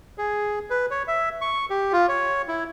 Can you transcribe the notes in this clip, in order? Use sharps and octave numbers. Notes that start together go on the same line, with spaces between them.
G#4
B4
C#5
E5
C#6
G4
F4
C#5
E4